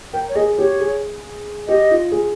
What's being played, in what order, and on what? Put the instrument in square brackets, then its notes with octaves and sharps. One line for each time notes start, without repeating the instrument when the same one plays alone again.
[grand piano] A#4 [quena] G5
[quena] C#5
[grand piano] G#4 [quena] D#5
[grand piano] G4 [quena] C#5
[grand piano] G#4
[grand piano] G4 [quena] D#5
[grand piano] F4
G#4